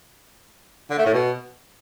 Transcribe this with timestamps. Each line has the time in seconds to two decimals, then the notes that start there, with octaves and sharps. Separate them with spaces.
0.90 D3
0.98 A3
1.06 A2
1.13 B2